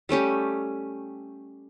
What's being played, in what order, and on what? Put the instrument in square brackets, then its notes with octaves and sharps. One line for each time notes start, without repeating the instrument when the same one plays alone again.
[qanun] G3 A3 C#4 G4